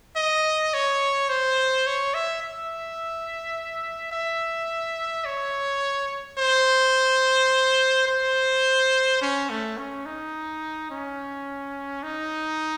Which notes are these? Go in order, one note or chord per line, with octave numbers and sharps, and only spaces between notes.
D#5
C#5
C5
C#5
E5
E5
E5
C#5
C5
C5
C#4
A3
C#4
D#4
C#4
D#4